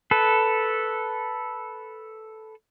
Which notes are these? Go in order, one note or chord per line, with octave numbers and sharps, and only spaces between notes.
A4 B4